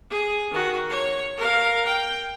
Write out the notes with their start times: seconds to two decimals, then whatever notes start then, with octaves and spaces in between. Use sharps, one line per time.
0.10 G#4
0.51 D#3 F#4
0.90 C#5
1.37 A#4 F5
1.86 G5